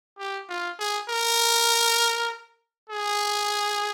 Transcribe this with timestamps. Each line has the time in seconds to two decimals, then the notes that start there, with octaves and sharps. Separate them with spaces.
0.19 G4
0.49 F4
0.79 G#4
1.09 A#4
2.90 G#4